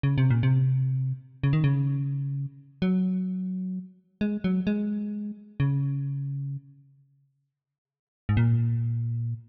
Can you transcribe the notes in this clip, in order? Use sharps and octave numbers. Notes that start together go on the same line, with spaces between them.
C#3
C3
A#2
C3
C#3
D#3
C#3
F#3
G#3
F#3
G#3
C#3
G#2
A#2